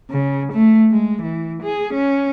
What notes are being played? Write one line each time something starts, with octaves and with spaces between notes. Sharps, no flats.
C#3
A3
G#3
E3
G#4
C#4